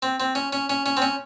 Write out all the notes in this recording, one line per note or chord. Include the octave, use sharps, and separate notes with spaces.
C4
C4
C#4
C#4
C#4
C#4
C4
C#4